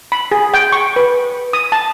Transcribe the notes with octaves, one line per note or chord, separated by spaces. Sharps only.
B5
G#4
G5
C#6
B4
D#6
A5